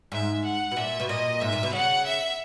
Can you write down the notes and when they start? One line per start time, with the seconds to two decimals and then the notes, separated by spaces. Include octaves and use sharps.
0.12 G#2 E5
0.45 F#5
0.72 B2
0.76 A#2 E5
1.00 B2
1.08 A#2 D#5
1.41 G#2 E5
1.53 A#2
1.63 B2
1.73 C#3 F#5
2.05 E5